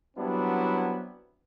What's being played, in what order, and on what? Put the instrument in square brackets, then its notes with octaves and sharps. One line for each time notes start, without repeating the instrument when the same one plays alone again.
[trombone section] F#3 G3 B3 C4 D4 E4